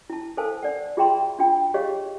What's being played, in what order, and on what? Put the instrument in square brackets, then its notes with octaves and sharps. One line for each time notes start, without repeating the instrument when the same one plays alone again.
[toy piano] E4 A5
A4 A#4 C5 F5 G#5 A5
D5 F#5
F4 G#4 E5 G5 A#5 C6
D4 F4 G5
G4 G#4 C#5 D#5 F5